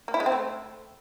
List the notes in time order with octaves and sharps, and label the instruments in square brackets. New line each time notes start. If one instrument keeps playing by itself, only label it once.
[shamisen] A#3
E4
G#3
C4
A3